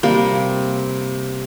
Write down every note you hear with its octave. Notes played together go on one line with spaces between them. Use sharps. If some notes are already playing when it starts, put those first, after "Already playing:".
C3 G3 A#3